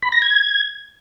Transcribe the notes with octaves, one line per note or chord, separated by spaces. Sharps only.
B5
A#6
G#6